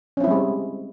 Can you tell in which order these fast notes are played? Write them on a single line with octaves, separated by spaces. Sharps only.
C#4 C4 E4 G3 G#3